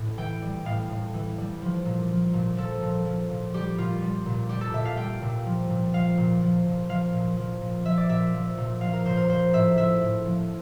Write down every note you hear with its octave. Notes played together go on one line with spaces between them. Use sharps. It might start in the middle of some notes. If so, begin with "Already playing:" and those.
Already playing: A2
E3 G5
G3
A2 F5
A2
E3
G3
F3
A#2
F3
A#2
F3 A4
A#2
F3
A#2
G3 G4
A#2 F4
G3
A#2
G3 G4
A4
A#2 E5
F5
G3 G5
A#2
F3
A#2
F3 F5
A#2
F3
A#2
F3 F5
A#2
F3
A#2
F3 E5
D5
A#2 E5
F3
A#2
F3 F5
A#4
A#2 C5
A#4
F3 C5
A2 E5
F3 E5
A2
F3